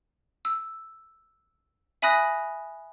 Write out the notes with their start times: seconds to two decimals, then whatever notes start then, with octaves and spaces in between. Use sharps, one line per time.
0.45 E6
2.02 E5 G#5 B5 D#6 F#6 A#6